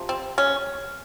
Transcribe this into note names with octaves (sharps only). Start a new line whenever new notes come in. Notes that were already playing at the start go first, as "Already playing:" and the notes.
Already playing: C3 F3
C4
C#4